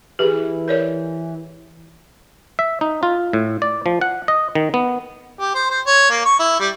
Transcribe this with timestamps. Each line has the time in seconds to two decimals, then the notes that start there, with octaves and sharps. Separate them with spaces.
0.19 E3 G4 G#4
0.68 A#4 C#5 D5
2.59 E5
2.81 D#4
3.03 F4
3.33 A2
3.62 D5
3.86 F3
4.01 F#5
4.28 D#5
4.55 D#3
4.74 B3
5.39 G4
5.54 C5
5.70 C5
5.86 C#5
6.10 A#3
6.25 C#6
6.39 E4
6.60 G3